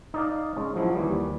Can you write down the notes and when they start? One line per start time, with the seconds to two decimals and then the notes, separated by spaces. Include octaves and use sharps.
0.14 D#4 D5 F5
0.57 G#3 C#4
0.76 F3 F#3 E4
0.95 D#2 E3 G3